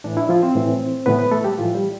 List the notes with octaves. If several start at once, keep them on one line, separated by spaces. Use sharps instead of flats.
A2 E3 D4
E4
F3 F4
C4 C5
A2 E3
A2 E3 B3 B4
B3 B4
A3 A4
G3 G4
A2 E3 F3 F4
G3 G4